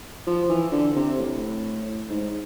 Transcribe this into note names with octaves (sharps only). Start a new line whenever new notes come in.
F3
E3
D3
C3
A2
G#2